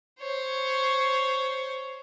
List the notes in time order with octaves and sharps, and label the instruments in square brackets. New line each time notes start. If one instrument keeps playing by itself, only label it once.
[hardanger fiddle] C5 C#5